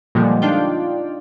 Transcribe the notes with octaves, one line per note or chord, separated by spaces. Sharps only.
A#2 D3 F3 G3 G#3
D4 D#4 F4 D5 G5